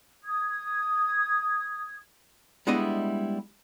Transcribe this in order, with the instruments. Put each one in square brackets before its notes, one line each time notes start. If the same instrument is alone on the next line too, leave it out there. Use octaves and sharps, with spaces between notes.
[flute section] D#6 G#6
[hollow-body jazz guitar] G3 G#3 B3 D4 E4 D#5